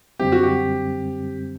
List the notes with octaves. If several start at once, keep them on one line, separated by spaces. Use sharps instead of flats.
F#2 D3 G3 C4 G4
F#4
G4